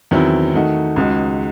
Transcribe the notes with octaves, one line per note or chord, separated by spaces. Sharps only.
E2 D#3 F#3 C4 E4
D#3 A3 D#4 F#4
C#2 C#3 G#3 D#4 F#4